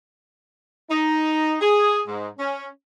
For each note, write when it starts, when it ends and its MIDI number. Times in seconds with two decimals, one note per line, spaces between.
0.90 1.56 63
1.61 2.02 68
2.08 2.29 44
2.39 2.67 61